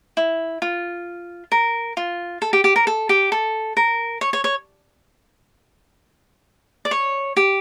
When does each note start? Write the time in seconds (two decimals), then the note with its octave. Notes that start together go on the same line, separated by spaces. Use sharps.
0.17 E4
0.62 F4
1.52 A#4
1.97 F4
2.42 A4
2.53 G4
2.64 G4
2.76 A#4
2.87 A4
3.09 G4
3.32 A4
3.77 A#4
4.21 C#5
4.33 C#5
4.44 C#5
6.85 D5
6.91 C#5
7.37 G4